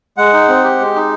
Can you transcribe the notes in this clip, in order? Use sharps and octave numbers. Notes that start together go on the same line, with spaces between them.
G#3 F#5
D#4
C4
G4
G#3
D#4